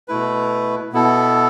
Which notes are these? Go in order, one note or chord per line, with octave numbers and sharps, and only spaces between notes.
B2 A3 E4 B4
B2 B3 E4 A4